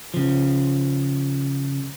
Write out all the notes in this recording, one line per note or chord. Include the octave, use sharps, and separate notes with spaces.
C#3 F3